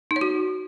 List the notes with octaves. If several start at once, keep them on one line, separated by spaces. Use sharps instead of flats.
D#4
C#5
F#4